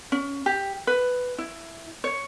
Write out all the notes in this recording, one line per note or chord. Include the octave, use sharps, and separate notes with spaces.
C#4
G4
B4
E4
C#5